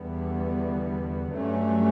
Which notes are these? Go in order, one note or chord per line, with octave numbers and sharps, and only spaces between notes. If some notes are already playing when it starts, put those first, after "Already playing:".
Already playing: E2 D3 G3 B3
G2 F#3 A3 C#4